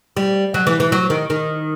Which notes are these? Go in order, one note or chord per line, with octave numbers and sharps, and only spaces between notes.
G3
F#3
E3
E3
F#3
D#3
D#3